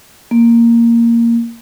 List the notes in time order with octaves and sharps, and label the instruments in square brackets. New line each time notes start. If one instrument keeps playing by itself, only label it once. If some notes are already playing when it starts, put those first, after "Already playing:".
[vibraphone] A#3